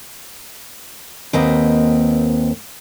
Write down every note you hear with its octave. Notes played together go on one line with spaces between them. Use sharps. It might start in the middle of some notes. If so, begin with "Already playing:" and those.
D#2 A#3 C4 B4 D#5 F#5